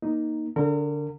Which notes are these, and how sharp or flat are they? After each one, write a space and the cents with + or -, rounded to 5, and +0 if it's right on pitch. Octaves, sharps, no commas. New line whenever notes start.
A#3 +15 D#4 +0
D3 -15 A#4 -35